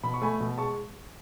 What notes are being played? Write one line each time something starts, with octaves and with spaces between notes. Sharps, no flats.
B2 B5
C#6
A3 G#5 B5
B2
G#3 A5 C#6